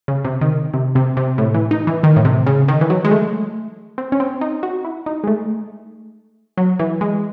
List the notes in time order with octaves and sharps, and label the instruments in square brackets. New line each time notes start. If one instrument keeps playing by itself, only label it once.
[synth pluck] C#3
C3
D#3
C3
C3
C3
A2
E3
D#4
E3
D#3
A2
C3
C#3
D#3
E3
F#3
G#3
A3
C4
C#4
C4
D#4
F#4
E4
D#4
G#3
A3
F#3
E3
G#3